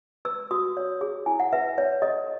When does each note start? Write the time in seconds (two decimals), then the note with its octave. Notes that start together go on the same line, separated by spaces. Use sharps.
0.25 B4 E6
0.51 F#4 D#6
0.77 C#5
1.01 G#4
1.26 E4 G#5
1.40 F#5
1.53 B4 E5
1.78 C#5
2.02 A4 D#5